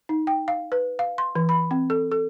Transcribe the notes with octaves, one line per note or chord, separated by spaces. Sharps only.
D#4
G5
F5
B4
F5
C6
E3
B5
C4
A4
A4